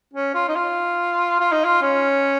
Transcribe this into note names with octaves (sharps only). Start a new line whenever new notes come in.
C#4
F4
D#4
F4
F4
D#4
F4
C#4